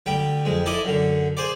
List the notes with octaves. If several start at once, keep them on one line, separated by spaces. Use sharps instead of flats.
D2 G3 G5
F2 G#3
E4 A4 D5 D#5
F#2 D3
G#4 C5 D5